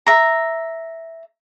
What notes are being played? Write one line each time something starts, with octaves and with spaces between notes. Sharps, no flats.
E5 A#5